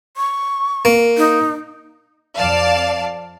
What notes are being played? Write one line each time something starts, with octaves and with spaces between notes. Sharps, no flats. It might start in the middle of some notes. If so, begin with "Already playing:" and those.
C#6
A#3
D#4
F2 D5 F5 A5